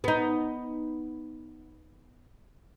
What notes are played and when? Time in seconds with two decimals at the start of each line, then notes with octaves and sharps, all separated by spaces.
0.04 B3 D#4